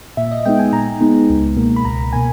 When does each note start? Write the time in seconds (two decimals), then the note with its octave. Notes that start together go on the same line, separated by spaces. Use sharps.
0.17 A#2 E5
0.31 D#5
0.45 G#3 B3 D#4 G5
0.59 G#5
0.73 A#2 A#5
1.01 G#3 B3 D#4
1.30 C#2
1.56 B2 A#3
1.76 B5
1.85 C#2 A#5
2.13 B2 A#3 G#5